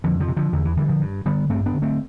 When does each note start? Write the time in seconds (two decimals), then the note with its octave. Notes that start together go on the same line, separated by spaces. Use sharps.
0.04 F2 D3 F3
0.20 D3 F3
0.28 C3
0.37 D3 F3
0.53 E2 D3
0.65 E3
0.77 D3 E3 G3
0.88 D3 F3
1.01 G2
1.25 D3 G3 B3
1.49 G2 A3 C4
1.66 B3 D4
1.73 D3
1.82 A3 C4